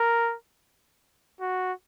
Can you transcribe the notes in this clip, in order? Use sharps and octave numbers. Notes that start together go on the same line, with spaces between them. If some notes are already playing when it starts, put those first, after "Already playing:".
Already playing: A#4
F#4